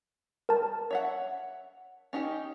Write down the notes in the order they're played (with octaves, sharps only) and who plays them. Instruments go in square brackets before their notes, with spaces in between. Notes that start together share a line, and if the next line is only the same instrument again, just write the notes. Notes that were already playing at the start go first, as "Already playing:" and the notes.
[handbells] A#4 A5
[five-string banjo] C#5 E5 F#5
C#4 D#4 G4